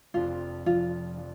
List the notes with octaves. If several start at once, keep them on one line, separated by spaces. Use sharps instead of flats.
F1 F2 F3 D4 F4
F1 F2 F3 D4 F4
F3 D4